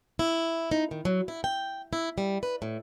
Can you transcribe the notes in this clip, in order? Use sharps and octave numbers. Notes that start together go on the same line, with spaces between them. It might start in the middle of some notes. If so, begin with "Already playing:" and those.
E4
D#4
D#3
F#3
E4
G5
E4
G3
B4
A2